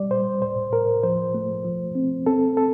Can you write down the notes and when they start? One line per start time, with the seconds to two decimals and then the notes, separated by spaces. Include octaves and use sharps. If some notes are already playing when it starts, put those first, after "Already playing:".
Already playing: G3 D5
0.11 A#2 C5
0.42 A2 C5
0.72 A2 A#4
1.03 F3 C5
1.34 A3
1.65 F3
1.95 C4
2.26 C4 A4
2.57 A4